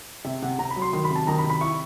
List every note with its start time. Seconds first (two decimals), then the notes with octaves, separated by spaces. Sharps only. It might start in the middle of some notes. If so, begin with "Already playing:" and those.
0.24 C3 E5
0.42 C3 F#5
0.59 C3 A#5
0.70 B5
0.76 F#3
0.82 C6
0.93 D#3 C6
1.05 B5
1.10 C3
1.16 A5
1.27 D#3 A#5
1.39 B5
1.44 C3
1.50 B5
1.61 E4 C#6